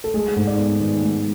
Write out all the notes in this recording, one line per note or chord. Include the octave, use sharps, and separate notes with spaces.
A4
G#3 G#4
G#2
D5
B3
D#3
G#3